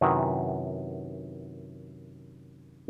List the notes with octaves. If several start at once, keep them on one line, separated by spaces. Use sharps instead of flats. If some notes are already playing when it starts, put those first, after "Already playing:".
F#2 C3 D#3 E4 F#4 B4